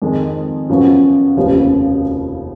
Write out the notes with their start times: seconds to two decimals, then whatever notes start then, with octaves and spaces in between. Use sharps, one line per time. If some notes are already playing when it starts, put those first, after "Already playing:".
0.02 F2 D#3 G#3
0.69 F#2 C#3 F3 B3 F#4
1.37 F1 D#2 C#3 F3 B3